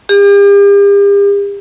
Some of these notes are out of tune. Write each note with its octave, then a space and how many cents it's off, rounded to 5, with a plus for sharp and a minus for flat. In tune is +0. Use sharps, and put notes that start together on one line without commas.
G4 +45